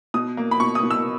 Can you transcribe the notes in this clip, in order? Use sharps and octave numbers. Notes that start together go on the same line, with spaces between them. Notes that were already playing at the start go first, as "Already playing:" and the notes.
B2 D#6
A#3
B5
B2 C#6
D#6
B2
E6